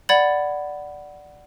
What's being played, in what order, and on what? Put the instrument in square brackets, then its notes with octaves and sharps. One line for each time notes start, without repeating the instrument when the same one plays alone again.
[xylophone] D5 F#5 B5 G#6 A6 F#7